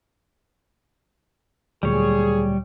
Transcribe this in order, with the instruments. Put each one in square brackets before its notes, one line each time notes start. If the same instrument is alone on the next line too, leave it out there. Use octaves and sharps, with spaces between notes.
[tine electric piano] D2 A#2 F#3 [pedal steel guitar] G3 C#5 [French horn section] G#4